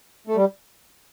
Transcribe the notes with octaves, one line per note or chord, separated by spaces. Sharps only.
A3
G3